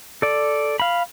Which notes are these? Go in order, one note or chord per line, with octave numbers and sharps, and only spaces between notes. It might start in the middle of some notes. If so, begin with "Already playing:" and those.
A4 D5
F5 B5